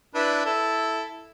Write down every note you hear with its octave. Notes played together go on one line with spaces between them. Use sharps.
D4 E4 B4
E4 A4